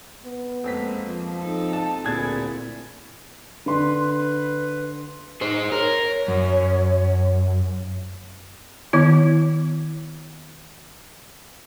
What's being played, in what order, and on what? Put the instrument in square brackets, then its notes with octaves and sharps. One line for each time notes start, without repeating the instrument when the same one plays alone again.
[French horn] B3
[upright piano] F2 C4 B6 [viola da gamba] G#3 A#3
[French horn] F3
[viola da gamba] C4 D#4 A4
[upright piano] A5
[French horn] D2 [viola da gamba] A#2 C4 E4 [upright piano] G#4 G#6 A6
[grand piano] D3 C6 [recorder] B4
[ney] D#4 [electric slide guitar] G#4 C5
[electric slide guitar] A#4 [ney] C#5
[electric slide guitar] F#2
[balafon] D#3 B3 E4